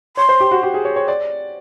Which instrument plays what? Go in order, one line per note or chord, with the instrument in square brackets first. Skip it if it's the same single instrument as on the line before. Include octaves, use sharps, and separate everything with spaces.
[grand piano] C#5 [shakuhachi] C6
[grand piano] C5
G4
F#4
G4
G#4
C#5
C#5
D5